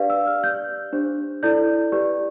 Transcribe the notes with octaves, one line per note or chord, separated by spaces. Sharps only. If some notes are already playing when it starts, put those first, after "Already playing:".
Already playing: D4 G4 B4 D5 F5
E6
F6
G4 D5 G6
D4 G4 C5
E4 A4 D5 G6
G4 B4 D5